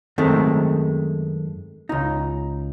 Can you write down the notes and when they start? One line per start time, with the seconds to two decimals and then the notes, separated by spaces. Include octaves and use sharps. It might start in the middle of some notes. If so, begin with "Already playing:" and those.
0.18 F#2 D#3 G#3 A3 C4
1.89 C#2 D#4